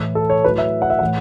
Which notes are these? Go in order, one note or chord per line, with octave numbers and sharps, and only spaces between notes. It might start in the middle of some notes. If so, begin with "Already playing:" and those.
Already playing: A2 E3
A4
C#5
A2 F#3 B4
E5
F#5
E5
A2 E3 F#5